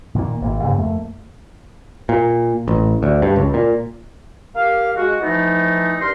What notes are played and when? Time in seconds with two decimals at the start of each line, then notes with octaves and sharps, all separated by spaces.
0.15 A#2 D#3 A3 A#3
0.41 G#1 C#3 A#3
0.63 G2 C#3
0.78 F2 A3 A#3
2.09 A#2
2.68 A1
3.03 D2
3.22 G2
3.36 C#2
3.54 A#2
4.55 A#3 G4 F5
4.96 G#3 F#4
5.22 E3 F3 A3 D#4
6.01 G2 A#4 C6